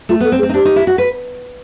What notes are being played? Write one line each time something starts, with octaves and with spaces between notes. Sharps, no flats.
A3 F4
B3 A4
C4
G#4
C4
D#4
D4 G4
D#4
E4
F#4
B4